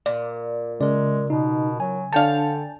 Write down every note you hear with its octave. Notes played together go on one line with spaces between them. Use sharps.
A#2 D5
C#3 G#3 A#4 D5
B2 D#4
F#3 G#5
D3 D4 C#5 F5 G5 A5